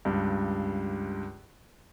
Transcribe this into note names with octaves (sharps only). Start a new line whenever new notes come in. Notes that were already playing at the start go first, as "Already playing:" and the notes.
C#2 G2